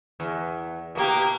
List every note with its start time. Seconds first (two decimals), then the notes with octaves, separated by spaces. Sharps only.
0.20 E2
0.95 B2 A#3 G4